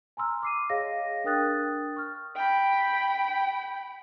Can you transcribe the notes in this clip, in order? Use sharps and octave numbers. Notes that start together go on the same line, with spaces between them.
G#5 A#5 C6 E6 F6
D6 C7 D#7
G#4 C#5 D#5 F5 A#6
D4 A#4 G5 D#6 F#6 A6
C#6 F6
G5 B5